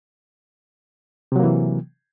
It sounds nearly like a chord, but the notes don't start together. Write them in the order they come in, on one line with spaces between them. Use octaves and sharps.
C3 F#3 A#3 E3